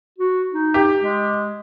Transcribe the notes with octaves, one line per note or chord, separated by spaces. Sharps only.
F#4
D#4
G4
G#3